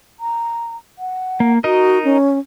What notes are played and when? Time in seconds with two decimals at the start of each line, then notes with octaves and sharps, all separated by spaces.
0.20 A#5
0.99 F#5
1.40 A#3
1.64 D#4 F#4 A#4 D#5
2.05 C#4